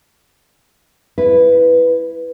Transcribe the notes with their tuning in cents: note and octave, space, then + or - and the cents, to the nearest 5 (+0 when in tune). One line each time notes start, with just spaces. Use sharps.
E4 +0 B4 +0